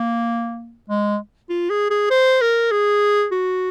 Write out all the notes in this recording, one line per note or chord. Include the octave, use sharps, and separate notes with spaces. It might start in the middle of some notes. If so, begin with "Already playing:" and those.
Already playing: A#3
G#3
F4
G#4
G#4
C5
A#4
G#4
F#4